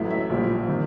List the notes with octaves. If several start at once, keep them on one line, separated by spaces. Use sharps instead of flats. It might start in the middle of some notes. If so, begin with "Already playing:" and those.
Already playing: A1 A2 F#3 E5
E5
A#1 A#2 G3
C3 D#3